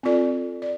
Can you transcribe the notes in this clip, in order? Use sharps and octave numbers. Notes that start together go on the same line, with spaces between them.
C4 F4 A4 D5
D5